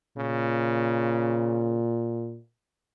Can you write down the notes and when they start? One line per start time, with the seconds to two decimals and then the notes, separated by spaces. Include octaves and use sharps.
0.17 A#2 C#3